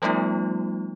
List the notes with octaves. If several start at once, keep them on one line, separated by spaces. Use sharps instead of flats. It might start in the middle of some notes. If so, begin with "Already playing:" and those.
F3 G3 A3 B3 D#4 F4